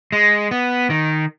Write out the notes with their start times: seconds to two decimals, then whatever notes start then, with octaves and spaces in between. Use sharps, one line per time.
0.12 G#3
0.51 B3
0.90 D#3